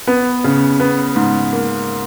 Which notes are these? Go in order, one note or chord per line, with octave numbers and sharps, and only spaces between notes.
B3
C#3
B3
G#2
A#3